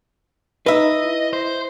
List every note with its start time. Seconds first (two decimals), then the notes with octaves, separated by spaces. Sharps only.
0.66 D#4 B4 D#5 E5
1.02 E4
1.33 C5